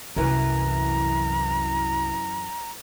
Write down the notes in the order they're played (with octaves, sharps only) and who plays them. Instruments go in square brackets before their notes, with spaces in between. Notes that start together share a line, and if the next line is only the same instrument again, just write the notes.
[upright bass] C2 [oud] F#2 E3 [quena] A#5